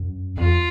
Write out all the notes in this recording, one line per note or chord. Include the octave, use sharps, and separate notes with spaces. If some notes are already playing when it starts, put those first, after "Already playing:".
Already playing: F#2
F2 F4